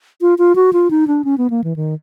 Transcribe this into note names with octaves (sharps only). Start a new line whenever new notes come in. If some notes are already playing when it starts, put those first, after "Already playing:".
F4
F4
F#4
F4
D#4
D4
C#4
B3
A#3
E3
D#3